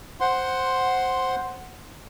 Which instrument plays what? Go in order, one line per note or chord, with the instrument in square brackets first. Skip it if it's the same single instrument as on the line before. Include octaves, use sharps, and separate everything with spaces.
[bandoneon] C5 F#5 C6